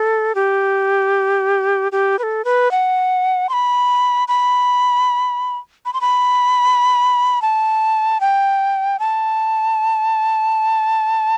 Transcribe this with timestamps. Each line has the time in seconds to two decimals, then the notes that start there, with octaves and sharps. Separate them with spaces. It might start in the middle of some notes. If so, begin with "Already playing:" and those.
Already playing: A4
0.35 G4
1.92 G4
2.19 B4
2.23 A4
2.45 B4
2.71 F#5
3.49 C6
3.53 B5
4.28 B5
5.86 B5
5.93 C6
6.01 B5
7.42 A5
8.21 G5
8.99 A5